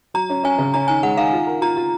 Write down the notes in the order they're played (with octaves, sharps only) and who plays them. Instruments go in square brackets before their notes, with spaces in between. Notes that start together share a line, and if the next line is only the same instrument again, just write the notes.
[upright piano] F#3 [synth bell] A#5
[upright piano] C#4
[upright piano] C#4 [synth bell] G#5
[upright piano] C#3
[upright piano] C#4 [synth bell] A#5
[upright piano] D#3 [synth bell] G#5
[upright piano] G#3 [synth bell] F#5
[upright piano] D#3 [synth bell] F5
[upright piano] F4
A#4
[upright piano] F4 [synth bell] A#5
[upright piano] F4